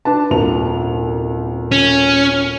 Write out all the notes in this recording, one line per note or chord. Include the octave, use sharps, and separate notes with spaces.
D4 B4 A5
D#1 C2 F7
C#4